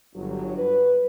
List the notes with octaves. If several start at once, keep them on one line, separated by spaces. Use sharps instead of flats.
G1 F#3
B4